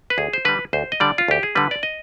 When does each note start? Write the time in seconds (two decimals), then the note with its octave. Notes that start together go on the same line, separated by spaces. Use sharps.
0.10 B4
0.18 D2 G#4
0.33 C5
0.45 D3 G3 B4
0.73 D2 C5
0.92 D#5
1.00 D3 G3 D5
1.18 F4
1.28 D2 G4
1.43 G#4
1.55 D3 G3 B4
1.71 D5
1.83 D#5